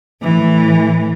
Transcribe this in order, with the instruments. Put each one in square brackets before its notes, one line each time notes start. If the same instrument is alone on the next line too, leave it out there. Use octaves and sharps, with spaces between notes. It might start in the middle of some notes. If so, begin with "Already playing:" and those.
[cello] A2 E3